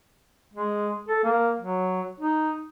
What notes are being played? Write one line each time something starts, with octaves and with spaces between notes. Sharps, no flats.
G#3
A4
A#3
F#3
D#4